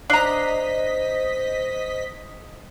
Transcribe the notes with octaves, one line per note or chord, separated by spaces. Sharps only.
D4 C5 D#5 A#5 B6